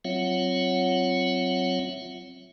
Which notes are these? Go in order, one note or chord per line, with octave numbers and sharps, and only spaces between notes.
F#3 C4 F4 C#5 E5 F#5